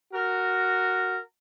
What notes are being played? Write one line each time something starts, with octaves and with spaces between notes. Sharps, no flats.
F#4 A#4